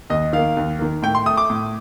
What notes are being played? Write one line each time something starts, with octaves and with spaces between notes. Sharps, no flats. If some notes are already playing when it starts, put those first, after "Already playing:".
D#2 D#5
D#3 A#3 F5
D#2
D#3 A#3
A2 G5
C6
A3 D#6
D6
A2